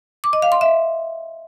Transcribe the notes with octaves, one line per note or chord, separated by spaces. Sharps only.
D6
D#5
F5
C6
E5